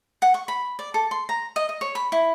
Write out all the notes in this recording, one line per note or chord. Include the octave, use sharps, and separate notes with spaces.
F#5
C#6
B5
D5
A4
C6
A#5
D#5
D#5
C#5
B5
E4